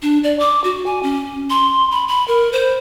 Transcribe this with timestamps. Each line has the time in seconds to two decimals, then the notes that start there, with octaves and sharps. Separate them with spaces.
0.02 D4
0.24 D5
0.39 D6
0.64 F#4
0.86 G#5
1.03 C#4
1.50 C6
1.91 B5
2.08 B5
2.28 A#4
2.53 C5